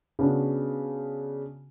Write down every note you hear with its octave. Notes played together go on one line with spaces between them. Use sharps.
C#3 B3 D4 F#4